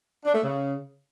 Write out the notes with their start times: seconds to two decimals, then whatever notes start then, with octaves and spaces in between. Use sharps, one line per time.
0.25 D4
0.34 A3
0.43 C#3